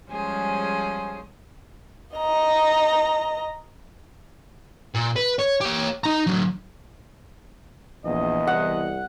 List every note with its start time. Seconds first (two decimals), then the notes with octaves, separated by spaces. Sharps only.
0.10 F3 G3 G#3 C#4 G#4 C5
2.16 D#5 A#5
4.95 A#2
5.16 B4
5.39 C#5
5.61 G4 C#5
6.04 D#4 A#5
6.27 D3 F#3
8.05 A#1 E2 D#5
8.47 C2 F#5